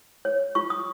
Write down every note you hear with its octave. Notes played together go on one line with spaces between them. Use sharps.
C#5
F4 C#6
D#6